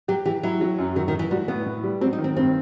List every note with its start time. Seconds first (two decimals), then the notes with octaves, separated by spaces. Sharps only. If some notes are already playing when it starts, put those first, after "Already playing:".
0.08 F#3 G4
0.25 E3 G4
0.43 F#3 E4
0.61 F#3
0.79 F#2
0.96 D#3 F#3
1.08 D#3
1.13 F#3
1.19 E3
1.31 G3 F#4
1.48 A2 B3
1.66 A2
1.84 G3
2.01 F#3 C4
2.13 D#4
2.18 D#3
2.24 C4
2.36 G2 C4